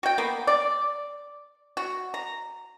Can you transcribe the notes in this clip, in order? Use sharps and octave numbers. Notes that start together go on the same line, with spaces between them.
F#4 G5
A#3 B3
D5
F#4
A#5